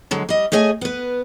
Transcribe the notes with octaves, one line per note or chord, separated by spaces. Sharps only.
D3 F#3 G#3
G3 D#5
A3 G#4 C#5 D#5 E5 G#5
B3 B4